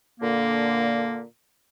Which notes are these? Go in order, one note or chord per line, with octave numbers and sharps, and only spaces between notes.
A#2 D3 A#3